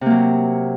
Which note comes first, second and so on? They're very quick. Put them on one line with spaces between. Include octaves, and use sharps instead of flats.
C3 A#3 F#3